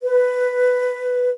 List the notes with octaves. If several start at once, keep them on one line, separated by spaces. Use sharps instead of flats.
B4